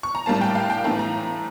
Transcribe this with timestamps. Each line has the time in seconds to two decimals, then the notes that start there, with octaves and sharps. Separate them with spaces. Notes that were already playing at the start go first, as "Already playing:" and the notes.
0.03 C#6
0.15 A#5
0.26 A2 G3 A#3 A5
0.41 G5
0.55 F5
0.70 G5
0.84 A2 E3 A3 A#5
0.99 A#5